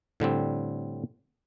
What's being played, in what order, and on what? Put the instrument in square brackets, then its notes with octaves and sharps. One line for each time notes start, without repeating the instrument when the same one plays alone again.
[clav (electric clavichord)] A2 D3 G3 C4